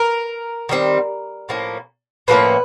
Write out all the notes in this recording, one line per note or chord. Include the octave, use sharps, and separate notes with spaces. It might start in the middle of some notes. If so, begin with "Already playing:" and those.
Already playing: A#4
D#3 G3 C4
A2 F3 A#3 C#4
A2 F3 A#3 C#4 B4